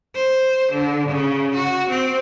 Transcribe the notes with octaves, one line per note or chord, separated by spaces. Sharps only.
C5
D3
C#3
F#4
C4